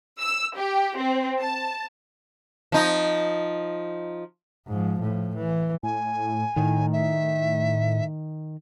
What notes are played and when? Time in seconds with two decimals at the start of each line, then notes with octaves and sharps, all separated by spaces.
0.20 E6
0.57 G4
0.96 C4
1.40 A5
2.72 F3 D#4
4.67 G#2 F3
5.01 A2 F3
5.36 E3
5.83 A2 G#5
6.56 A2 D#3
6.93 E5